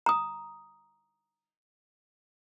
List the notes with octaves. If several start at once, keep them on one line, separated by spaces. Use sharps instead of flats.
A#5 D#6